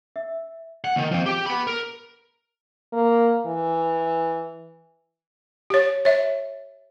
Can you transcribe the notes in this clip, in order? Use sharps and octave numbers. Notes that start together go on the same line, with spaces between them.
E5
F#5
D#2 D#3
F3 C4
G4 G5
B3 B5
A#4
A#3
E3
G4 C#5
C#5 E5